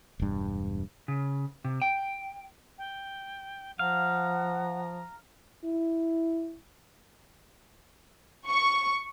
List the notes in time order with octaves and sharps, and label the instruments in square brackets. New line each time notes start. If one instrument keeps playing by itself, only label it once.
[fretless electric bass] E1 G2
[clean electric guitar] C#3
C3
G5
[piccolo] G5
[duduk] F3 [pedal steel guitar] F5 [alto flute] F#5 [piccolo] A#5
[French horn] E4
[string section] C#6